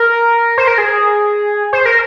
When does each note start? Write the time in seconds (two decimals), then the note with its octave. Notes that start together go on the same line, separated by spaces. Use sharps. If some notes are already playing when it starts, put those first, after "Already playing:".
Already playing: A#4
0.58 C5
0.67 A#4
0.78 G#4
1.73 C5
1.85 A#4